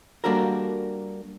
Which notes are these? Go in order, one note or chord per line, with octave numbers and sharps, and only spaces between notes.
G3 A#3 D4 F#4 A4 A#4